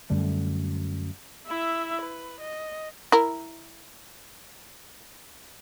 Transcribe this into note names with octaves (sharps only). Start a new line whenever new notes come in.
F#2 D3 G3 A3
E4 E5
B4
D#5
E4 A#4